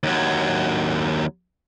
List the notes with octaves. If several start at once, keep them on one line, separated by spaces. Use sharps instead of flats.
D#2 F#3